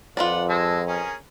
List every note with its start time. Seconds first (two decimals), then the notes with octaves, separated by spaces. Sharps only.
0.17 F2 F4 B4 D5 F#5
0.49 G#3 A5 E6
0.87 C#4 G#4 A#4